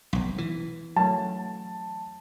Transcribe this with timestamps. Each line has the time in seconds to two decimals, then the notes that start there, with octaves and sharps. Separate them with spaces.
0.13 F1 B1
0.38 E3
0.96 F#3 A3 A5